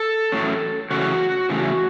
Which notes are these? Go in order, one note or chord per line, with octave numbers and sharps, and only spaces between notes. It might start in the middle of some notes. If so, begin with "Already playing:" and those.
Already playing: A4
A2 F#3 C#4
C#3 E3 A3 C#4 F#4
C#3 E3 A3 C#4